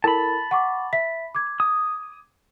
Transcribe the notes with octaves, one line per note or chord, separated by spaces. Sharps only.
E4 A4 A#4 A5 B5
F#5 C#6 D6
E5 B6
D6 G#6
D#6